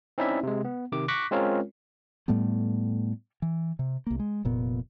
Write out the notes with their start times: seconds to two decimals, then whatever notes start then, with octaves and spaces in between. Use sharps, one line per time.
0.18 C4 C#4 D#4 E4 D5 E5
0.43 C3 G#3
0.65 B3
0.92 C3 D#3 D6
1.08 C#6 D6 F#6 A#6 B6
1.31 G#3 C4 C#4 F4 A#4 C#5
2.28 A2 G3 A3 B3
3.42 E3
3.79 C3
4.07 C2 A#3
4.20 G#3
4.45 F1 A#2 B3